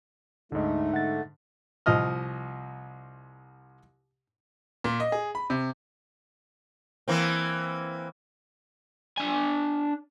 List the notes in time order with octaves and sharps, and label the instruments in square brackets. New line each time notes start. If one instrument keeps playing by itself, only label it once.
[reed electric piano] D2 D#5 [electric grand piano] G#2 D3 [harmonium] A3 [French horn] D#4
[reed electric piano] F#5 A6
[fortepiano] C2 F3 D#5 F6
[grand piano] A#2
D#5
G#4
B5
C3
[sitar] E3 A#3 C4
[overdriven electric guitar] D4 G#5